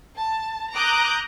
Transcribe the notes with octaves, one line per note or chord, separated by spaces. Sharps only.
A5
A#5 D6 D#6 F#6 G6